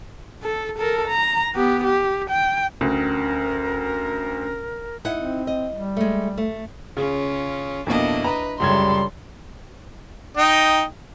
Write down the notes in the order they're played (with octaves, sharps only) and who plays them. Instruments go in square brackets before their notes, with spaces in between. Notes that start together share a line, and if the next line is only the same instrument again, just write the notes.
[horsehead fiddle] A4
A4 A#4
A#5
B3 G4
G4
G5
[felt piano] D2 [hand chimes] C#4 [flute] A#4
[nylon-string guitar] D#4 E4 F#5
[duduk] C4
[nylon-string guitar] D#5
[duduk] G3
[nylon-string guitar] G#3 A3
A3
[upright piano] C#3 [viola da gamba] C#4 F4
[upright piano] F2 B2 A#3 [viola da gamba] D4 E4 D#5
[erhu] B4 [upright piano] A#5
[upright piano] C#2 F#2 G#6 [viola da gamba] C#3 A4 [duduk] G3 [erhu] C6
[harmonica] D#4 D#5 G5